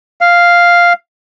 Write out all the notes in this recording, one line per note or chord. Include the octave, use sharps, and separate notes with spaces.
F5